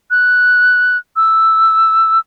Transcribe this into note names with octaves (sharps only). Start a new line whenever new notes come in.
F#6
E6